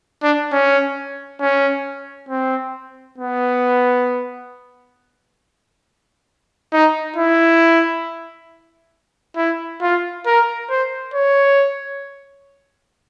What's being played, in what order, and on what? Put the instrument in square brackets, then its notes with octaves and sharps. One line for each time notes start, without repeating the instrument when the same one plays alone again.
[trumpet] D4
C#4
C#4
C4
B3
D#4
E4
E4
F4
A#4
C5
C#5